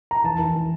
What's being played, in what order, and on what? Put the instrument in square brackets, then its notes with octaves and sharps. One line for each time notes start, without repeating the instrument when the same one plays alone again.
[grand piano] A#5
E3 A5
E3
E3